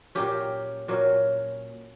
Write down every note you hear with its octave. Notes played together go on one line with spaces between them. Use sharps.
A#2 F#3 A#3 C#4 G4
A#2 F#3 A#3 C#4